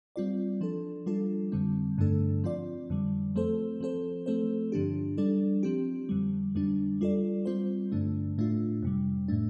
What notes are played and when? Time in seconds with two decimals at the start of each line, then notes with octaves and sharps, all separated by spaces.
0.16 G3 C4 F4 D5
0.61 F3 D4 A4
1.06 G3 D4 F4 A4
1.52 F2 D3 G3 C4
1.98 G2 D3 A3 D4 A4
2.44 F3 C4 F4 D5
2.90 F2 D3 G3
3.36 F3 A3 C4 A4 C5
3.80 F3 C4 A4 C5
4.26 F3 A3 C4 A4 C5
4.72 G2 D3 F3 D4 G4
5.18 G3 D4 A4 D5
5.63 F3 C4 G4
6.09 F2 D3 G3
6.55 F2 D3 G3 D4
7.01 G3 F4 A4 D5
7.46 G3 C4 F4 C5
7.92 G2 D3 A3 D4
8.38 A2 A3 D4 F4
8.83 F2 C3 G3
9.28 A2 A3 D4